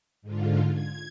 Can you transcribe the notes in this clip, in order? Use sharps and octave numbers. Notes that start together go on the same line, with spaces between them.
G#2 D3 F4
G#6